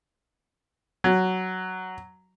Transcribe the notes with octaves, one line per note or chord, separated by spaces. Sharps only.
F#3